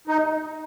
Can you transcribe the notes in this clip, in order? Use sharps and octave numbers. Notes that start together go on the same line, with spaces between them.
D#4